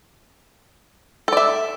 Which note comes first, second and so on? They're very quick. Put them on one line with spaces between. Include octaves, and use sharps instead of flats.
A4 D5 E5